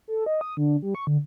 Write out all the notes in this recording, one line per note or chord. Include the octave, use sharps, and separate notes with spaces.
A4
D#5
D#6
D3
G3
C#6
D3